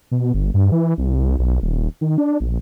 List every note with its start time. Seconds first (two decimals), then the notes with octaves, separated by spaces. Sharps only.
0.11 B2
0.34 G1
0.54 G2
0.72 E3
0.98 C2
1.39 B1
1.62 D#1
2.01 D#3
2.18 D4
2.40 A#1